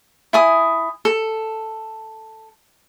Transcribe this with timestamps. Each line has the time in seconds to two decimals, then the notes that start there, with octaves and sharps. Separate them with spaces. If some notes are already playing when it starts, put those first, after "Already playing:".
0.33 E4 G#5 D#6
1.05 A4